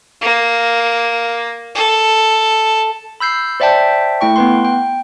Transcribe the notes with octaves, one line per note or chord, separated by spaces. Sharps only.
A#3
A4
B5 E6 G6 C7
C5 D5 E5 G5 A5
A3 E4 G5 C#6
B3 B4 C6
G5